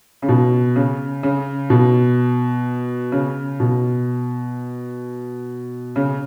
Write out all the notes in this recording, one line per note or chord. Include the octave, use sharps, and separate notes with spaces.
C#3
B2
C#3
C#3
B2
C#3
B2
C#3